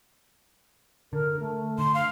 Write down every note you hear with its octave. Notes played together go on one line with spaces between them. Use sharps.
D3 A#4
A3
D3 C6
F5